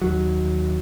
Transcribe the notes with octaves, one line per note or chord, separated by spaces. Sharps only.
D#2 F#3